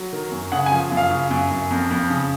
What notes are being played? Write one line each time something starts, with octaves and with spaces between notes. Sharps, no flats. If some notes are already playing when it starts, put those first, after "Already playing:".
Already playing: F#3
D#3
F#2
C#3 F#5
G#5
F3
F#2
F5
C#3
F#2
F#2
F2
F2
C#3